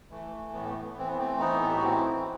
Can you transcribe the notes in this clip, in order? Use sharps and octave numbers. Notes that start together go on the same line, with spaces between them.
E3 A3
E3
A2 B3
A3
B3
E3
E3 C4
B3
E3 A3 C4
E3 B3 D#4
A2 A4
G4
F#4
E3 C4 E4
E3